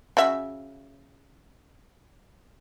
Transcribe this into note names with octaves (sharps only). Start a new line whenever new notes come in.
C#3 F#4 E5